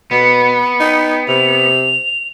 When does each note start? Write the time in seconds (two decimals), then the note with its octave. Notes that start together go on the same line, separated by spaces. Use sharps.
0.11 B2 B3
0.80 D#4 G5
1.28 C3 F7